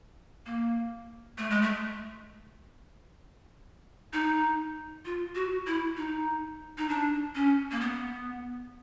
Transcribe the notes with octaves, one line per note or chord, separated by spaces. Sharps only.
A#3
A3
G#3
A3
D#4
F4
F#4
E4
D#4
D#4
D4
C#4
A#3
B3